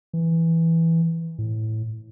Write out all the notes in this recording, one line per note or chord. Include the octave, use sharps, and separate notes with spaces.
E3
A2